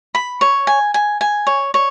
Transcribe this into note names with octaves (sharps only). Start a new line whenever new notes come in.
B5
C#5
G#5
G#5
G#5
C#5
C#5